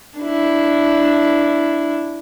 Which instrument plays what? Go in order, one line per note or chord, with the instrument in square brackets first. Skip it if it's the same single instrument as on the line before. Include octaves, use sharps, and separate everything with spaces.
[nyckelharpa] D4 E4